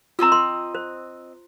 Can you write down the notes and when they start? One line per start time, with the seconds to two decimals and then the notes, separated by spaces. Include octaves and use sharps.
0.19 C4 F4 D#5 A#5 E6
0.32 C6
0.75 C5